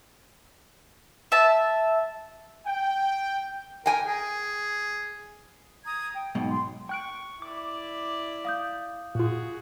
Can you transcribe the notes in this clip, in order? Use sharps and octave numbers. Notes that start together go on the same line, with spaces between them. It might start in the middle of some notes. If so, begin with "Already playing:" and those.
E5 A5
G5
A#4 G5 G#5
G#4
A#5 D#6 G#6
G5
B1 G#2 B2
C6
G5 C#6 F#6 D7
E4 D5 D6
F5 D#6 G6
A#2 F4 F#4 G#4